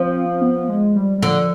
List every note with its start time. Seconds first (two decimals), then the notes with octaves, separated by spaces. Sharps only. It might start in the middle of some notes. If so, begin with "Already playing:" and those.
Already playing: F3 C4
0.41 B3
0.68 G#3
0.95 G3
1.18 G3
1.22 D3 F3